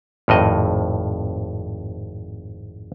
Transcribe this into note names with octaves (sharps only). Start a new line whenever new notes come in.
G#1 F2 A2 D#5